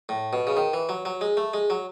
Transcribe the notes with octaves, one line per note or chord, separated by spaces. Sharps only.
A2
B2
C#3
D#3
E3
F#3
F#3
G#3
A3
G#3
F#3